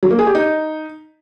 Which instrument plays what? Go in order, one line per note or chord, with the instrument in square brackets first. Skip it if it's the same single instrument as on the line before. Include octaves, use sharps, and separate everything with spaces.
[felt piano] F#3
A#3
G#4
G4
D#4